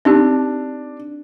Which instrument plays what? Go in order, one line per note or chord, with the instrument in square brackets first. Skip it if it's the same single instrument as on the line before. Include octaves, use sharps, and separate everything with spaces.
[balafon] C4 D#4 G4 [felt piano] D4